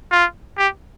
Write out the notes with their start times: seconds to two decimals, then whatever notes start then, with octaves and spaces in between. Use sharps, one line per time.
0.11 F4
0.58 G4